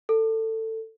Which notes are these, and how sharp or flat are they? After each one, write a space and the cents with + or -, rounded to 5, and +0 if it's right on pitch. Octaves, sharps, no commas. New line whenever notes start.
A4 +20